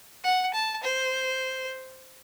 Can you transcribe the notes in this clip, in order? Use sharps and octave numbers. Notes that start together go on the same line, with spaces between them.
F#5
A5
C5